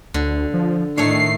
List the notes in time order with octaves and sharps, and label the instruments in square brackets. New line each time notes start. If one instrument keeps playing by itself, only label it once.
[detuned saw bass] D2 [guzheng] D3
[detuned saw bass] F3
[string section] A2 D#3 C7 [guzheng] A3 C#5 [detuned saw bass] D4